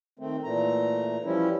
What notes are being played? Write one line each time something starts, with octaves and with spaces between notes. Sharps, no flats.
D#3 A3 C4
A#2 E3 A3 A#5
E3 F3 G3 C#4 E4